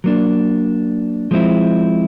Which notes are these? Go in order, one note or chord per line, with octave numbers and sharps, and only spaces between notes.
F#3 A#3 D4
F3 G#3 C4 E4